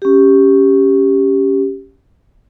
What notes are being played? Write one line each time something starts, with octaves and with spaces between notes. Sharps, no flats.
C#4 G4